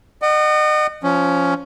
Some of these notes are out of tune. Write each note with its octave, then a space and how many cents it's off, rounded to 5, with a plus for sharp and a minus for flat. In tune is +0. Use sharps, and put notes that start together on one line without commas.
D#5 -35 F#5 +25
F3 +0 C#4 +10